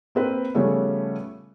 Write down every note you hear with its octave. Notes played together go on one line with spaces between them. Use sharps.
A#3 C4 B4
C#3 F3 G3 A3 B3 C#4